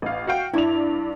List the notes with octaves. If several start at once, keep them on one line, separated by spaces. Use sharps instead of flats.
A1 F5
F#4 F5 G5
G2 E4 D5 F7